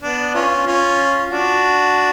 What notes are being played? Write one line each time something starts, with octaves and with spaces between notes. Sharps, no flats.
B3 D4
C#4 F4
C#4 F4
D4 F#4